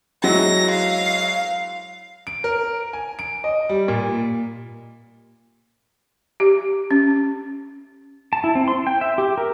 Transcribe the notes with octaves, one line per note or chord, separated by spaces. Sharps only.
F#3 G#3 E4 A#6
F5
D7
A#4
G#5
D7
D#5
G3
A#2
G4
C#4
A5
E4
C4
C6
G5
E5
G4
A#4